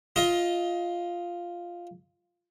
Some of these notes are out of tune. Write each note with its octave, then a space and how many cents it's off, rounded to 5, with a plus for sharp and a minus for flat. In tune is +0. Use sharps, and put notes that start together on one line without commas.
F4 +0 D#5 +20